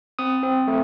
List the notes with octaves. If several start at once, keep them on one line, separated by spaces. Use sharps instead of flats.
C4 D#6
C4
A3